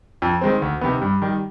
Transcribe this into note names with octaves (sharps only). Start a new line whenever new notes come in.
F2
D#3 G#3 C4
D2
C3 D#3 B3
G2
D#3 G3